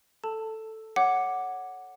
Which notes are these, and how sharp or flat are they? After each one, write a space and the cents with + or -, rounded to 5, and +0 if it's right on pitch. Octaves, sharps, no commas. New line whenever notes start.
A4 +0 A5 +15
C#5 +0 F#5 +0 D6 +0